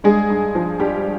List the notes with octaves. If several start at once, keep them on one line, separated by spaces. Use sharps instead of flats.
G2 G#3 G#4
G2
F3
G2 G3 G4